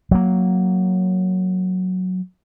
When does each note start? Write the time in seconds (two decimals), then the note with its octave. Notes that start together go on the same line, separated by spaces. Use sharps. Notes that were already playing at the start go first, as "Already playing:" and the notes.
0.11 F#3 A#3